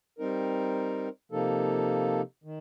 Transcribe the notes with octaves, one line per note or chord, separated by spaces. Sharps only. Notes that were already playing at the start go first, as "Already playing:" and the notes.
G3 C4 D#4 A#4
C3 F3 A#3 D#4 A4
D#3